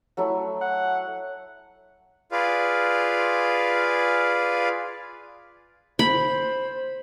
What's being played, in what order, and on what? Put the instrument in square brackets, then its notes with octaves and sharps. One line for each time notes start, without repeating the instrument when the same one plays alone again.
[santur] F#3 A3 E4
[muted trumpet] F#5
[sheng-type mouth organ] F4 G#4 B4 D5 F5
[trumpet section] C5 [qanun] B5